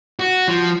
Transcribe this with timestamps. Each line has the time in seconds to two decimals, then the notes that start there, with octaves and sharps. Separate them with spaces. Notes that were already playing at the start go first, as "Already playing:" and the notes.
0.20 F#4
0.48 F3